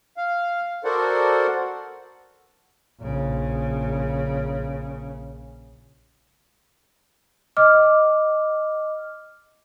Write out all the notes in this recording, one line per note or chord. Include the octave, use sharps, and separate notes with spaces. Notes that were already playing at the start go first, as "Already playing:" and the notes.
F5
F#4 A4 A#4 C5 D5 F#5
A#1 C#3
D#5 D6 F6